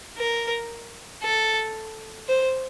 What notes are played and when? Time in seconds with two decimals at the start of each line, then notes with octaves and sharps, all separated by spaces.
0.18 A#4
1.23 A4
2.28 C5